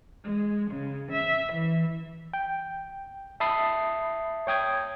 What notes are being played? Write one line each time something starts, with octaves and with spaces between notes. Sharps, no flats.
G#3
C#3
E5
E3
G5
E5 A5 B5 D#6 C7
C#5 G5 D#6 G#6